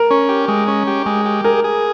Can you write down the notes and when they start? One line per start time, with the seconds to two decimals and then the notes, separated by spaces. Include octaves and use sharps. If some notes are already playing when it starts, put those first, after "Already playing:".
Already playing: A#4
0.11 C#4
0.29 G4
0.48 G#3
0.67 C#4
0.87 G4
1.06 G#3
1.25 G4
1.44 G#4 A#4
1.64 G#4